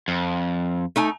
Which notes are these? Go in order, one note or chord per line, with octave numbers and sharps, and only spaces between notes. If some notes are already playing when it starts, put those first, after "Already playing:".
F2
A3 D#4 G#5